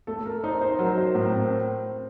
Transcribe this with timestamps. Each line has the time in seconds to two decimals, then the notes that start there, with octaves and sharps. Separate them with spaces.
0.07 A3 A4
0.26 A#4
0.44 D#4 C5
0.61 C5
0.79 F#3 A#4
0.98 C5
1.15 A2 A#4
1.33 C4